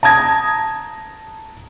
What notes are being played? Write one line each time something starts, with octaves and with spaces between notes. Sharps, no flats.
A5 A#5 D#6 G#6 A#6